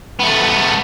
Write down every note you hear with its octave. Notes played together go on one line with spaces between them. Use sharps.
A3 B3